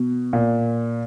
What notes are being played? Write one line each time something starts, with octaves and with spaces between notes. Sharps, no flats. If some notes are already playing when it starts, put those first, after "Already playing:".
Already playing: B2
A#2